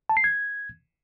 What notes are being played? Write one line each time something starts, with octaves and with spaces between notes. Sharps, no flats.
A5
C7
G#6